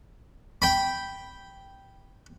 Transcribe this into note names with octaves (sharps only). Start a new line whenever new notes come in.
G5 B5